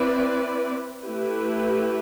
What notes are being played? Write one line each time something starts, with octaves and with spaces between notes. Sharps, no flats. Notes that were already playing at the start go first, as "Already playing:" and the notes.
Already playing: C4 E4 B4 D5
A3 E4 G4 B4